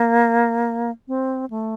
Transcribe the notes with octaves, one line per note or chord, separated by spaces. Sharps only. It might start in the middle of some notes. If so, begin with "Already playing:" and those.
Already playing: A#3
C4
A3